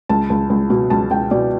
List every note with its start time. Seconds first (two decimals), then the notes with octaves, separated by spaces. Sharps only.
0.09 C#2 A5
0.30 C#2
0.50 C#2
0.70 B2
0.90 C#2 A5
1.11 C#2 G5
1.31 B2 D5